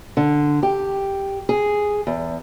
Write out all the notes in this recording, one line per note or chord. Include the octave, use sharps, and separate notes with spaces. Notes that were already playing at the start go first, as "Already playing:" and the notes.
D3
G4
G#4
E2